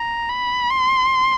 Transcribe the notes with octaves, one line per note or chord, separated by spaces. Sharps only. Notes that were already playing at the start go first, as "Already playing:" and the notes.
Already playing: A#5
B5
C6